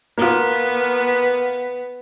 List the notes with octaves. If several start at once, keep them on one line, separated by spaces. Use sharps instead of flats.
A#3 B3 F4